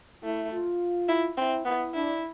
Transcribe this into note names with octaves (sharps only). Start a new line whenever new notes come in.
A3 E4
F4
E4
C4 E4
B3 E4
D4 E4